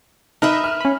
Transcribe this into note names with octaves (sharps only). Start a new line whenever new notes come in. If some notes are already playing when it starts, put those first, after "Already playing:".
D#4 A#4 B4 E5
F6
C#4 B5